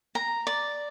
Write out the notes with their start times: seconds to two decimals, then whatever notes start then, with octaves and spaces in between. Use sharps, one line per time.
0.15 A#5
0.47 D5